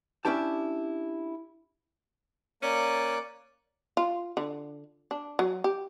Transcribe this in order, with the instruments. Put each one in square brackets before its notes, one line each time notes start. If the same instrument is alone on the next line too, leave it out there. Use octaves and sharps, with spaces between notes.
[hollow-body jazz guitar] C#4 D4 E4 G4 A5
[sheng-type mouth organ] A#3 D5 F#6 [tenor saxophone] C#4
[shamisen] F4
D3
D4
F#3
G4